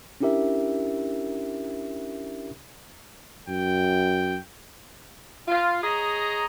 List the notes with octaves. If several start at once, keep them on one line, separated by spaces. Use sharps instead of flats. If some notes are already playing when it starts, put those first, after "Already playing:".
C#4 D4 E4 G4 A#4 E5
F#2 G5
F4
G#4 C#5 D#5 A#5